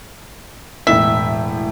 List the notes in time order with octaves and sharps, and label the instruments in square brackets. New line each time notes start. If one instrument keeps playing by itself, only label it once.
[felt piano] E1 A2 B6 [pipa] E5